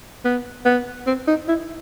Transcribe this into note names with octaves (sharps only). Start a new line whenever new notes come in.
B3
B3
C4
D#4
E4